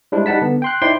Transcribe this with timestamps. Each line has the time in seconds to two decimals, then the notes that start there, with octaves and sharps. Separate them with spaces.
0.12 G3 G#3 D4 E4 C5
0.26 G3 D#4 F#5 A5 B6
0.42 D3 B3
0.62 G5 C6 F#6
0.82 D#4 E4 C5 D5 G5 C6